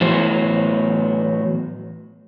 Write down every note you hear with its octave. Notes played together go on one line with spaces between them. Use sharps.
A2 E3 F#3 B3 C5